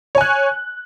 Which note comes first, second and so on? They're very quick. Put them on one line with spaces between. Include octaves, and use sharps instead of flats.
C#5 G#5 F#6